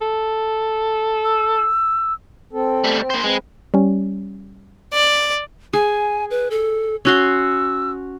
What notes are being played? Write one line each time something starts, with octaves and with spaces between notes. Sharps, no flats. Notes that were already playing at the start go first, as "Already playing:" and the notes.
A4
E6
C4 A4
G3 A3
C4
A#3 C5
G#3 C4 B4
G3 C#4
D5
G#4 G#5
B4
A4
C#4 F#4 C6 E6